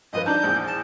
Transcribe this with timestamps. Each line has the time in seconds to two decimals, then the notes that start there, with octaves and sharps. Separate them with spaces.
0.13 G1 F3 B4 D#5
0.26 D4 D#4 A5 G6
0.44 A#1 E2
0.67 A5